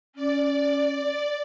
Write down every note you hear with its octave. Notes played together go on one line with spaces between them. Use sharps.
C#4 D5